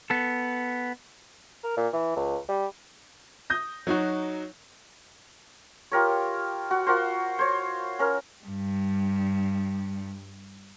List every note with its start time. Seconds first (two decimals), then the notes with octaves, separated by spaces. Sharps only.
0.10 B3 A4
1.64 A#4
1.77 A#2
1.93 E3
2.16 C#2
2.49 G3
3.50 D#6 G6 A#6
3.87 F#3 D#4 F#4
5.92 F4 G4 A#4 C#5
6.71 F#4
6.87 F4 F#4 A#4 C5
7.39 C5 C#5
7.99 C#4 A#4
8.43 G2 G3